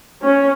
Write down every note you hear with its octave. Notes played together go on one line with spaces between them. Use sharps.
C#4